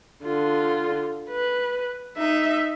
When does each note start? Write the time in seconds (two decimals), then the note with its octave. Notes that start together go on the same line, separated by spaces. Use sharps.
0.24 D3 F4
1.30 B4
2.17 D#4 E5